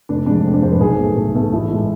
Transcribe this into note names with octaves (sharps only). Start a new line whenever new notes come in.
F1 D4
F2 C3 G#3 D4
F1 C4
D4
F2 C3 G#3 C5
B4
B1 G#4
B2 A3
B1
B2 A3
A1 E4
A2 G#3